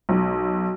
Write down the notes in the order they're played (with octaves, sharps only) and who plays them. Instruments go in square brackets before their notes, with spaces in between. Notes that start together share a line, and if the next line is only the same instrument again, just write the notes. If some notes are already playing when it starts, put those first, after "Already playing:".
[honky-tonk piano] B1